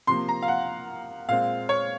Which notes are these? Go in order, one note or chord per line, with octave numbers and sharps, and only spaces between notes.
C3 F3 A#3 C6
A#5
F5
F#5
A#2 G#3 C4 F5
C#5